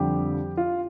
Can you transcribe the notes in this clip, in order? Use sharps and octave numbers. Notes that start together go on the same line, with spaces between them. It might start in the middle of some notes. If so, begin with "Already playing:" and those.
Already playing: F2 D3 G3 G4
F4